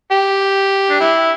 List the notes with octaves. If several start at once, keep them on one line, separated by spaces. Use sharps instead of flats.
G4
D4
E4